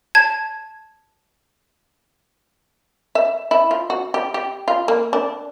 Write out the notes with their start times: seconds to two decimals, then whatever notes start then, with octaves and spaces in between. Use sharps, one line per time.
0.15 A5 G#6
3.15 E5
3.51 E4
3.71 F4
3.90 F#4
4.14 G4
4.34 G4
4.68 F4
4.88 A#3
5.13 D4